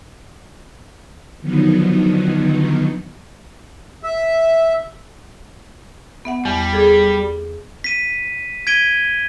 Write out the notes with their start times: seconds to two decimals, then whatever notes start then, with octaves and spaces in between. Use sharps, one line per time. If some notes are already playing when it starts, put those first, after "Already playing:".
1.42 D3 D#3 F3 F#3 B3 D#4
4.03 E5
6.25 B3 E5 F#5
6.45 E2 G3
6.73 G#4 A4
7.84 B6 D#7
8.67 G#6 B6 D7 D#7 G7